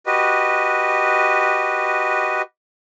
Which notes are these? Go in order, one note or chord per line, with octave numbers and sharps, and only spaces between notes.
F#4 G4 B4 D#5